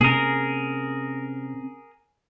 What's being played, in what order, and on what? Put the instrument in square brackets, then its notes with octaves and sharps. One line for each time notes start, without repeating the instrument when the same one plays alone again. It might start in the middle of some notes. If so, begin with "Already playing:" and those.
[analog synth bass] C3 [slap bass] A#3 C4 C#4 [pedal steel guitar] G#4 A#4